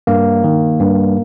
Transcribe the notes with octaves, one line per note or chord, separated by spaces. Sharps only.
G2 A#3
D#3
G2